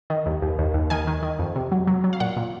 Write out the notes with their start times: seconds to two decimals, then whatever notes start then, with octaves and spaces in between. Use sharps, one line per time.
0.10 D#3
0.26 D#2
0.42 D#2
0.59 D#2
0.74 D#2
0.90 D#3 G#5
1.07 D#3
1.23 D#3
1.39 F2
1.56 C3
1.72 F#3
1.87 F#3
2.04 F#3
2.13 F5
2.20 A#2 F#5
2.37 A#2